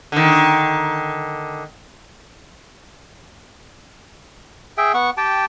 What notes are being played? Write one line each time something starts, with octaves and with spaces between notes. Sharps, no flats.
D3 D#3
G#4 E5 G5
B3 F#5 C#6
G4 G5 A5